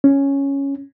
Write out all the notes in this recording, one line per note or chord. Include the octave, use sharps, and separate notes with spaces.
C#4